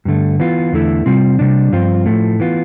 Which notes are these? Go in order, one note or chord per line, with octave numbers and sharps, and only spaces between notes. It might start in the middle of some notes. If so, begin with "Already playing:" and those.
G2 D3 A3
E3 B3 F4
E2 D3 A3 E4
C3 G3 C4 F4
C3 G3 D4
G2 F3 C4 F4
A2 F3 A3
E3 B3 F4